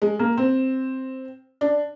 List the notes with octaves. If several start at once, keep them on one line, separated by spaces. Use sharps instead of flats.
G#3
A#3
C4
D4